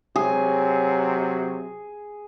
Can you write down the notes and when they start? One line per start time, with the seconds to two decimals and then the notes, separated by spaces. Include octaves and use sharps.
0.16 C3 F#3 G#4